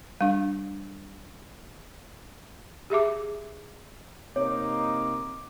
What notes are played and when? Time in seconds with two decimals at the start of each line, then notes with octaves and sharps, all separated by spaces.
0.21 G3 D4
2.90 G4 G#4 E5 D6
4.36 C3 A#3 D#4 C#5 D6